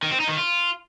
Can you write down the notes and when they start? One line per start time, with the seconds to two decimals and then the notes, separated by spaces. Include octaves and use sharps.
0.03 D#3
0.11 C4
0.20 D#4
0.29 D#3
0.37 F4